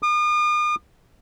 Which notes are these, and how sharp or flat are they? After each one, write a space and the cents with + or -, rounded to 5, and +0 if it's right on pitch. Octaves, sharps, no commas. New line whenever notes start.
D#6 -45